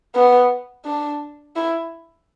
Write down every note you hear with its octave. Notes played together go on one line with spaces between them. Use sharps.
B3
D4
E4